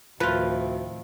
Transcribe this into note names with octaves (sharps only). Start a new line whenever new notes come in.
D2 A2 C3 D#3 F3 F4 B4